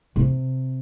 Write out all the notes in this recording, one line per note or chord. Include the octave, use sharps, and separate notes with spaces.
C3